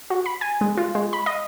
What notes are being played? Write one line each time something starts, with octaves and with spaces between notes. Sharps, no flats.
F#4
B5
G#5
G#3
F4
G#3
B5
D#5